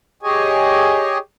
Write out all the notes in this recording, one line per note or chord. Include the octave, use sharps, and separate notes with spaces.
G4 G#4 C#5 D#5 G#5